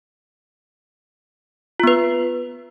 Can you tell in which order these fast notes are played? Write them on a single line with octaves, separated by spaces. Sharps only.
F4 B3 B4